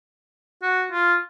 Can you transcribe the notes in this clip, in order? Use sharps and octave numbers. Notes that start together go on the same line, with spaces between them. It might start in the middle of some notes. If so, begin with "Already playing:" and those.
F#4
F4